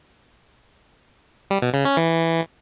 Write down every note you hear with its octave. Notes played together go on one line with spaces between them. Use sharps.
G3
B2
C#3
C#4
E3